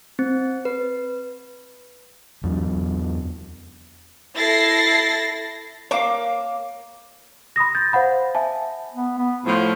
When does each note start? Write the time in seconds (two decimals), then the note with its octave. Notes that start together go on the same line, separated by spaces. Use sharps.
0.19 C4
0.65 B4
2.43 E2 F#3 D4
4.37 E4 A4 A6 A#6 C7
5.91 A#3 C#5 F5 D6
7.56 B5 C6 D#6 A#6
7.75 G6 A6
7.93 C5 F5 F#5 B5
8.35 E5 G#5 A5
8.94 B3
9.18 B3
9.46 A2 F3 F4